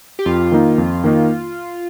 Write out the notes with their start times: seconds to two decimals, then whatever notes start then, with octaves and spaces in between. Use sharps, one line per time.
0.19 G4
0.26 F2 F4
0.52 D#3 A#3 D#4
0.78 F2
1.04 D#3 A#3 D#4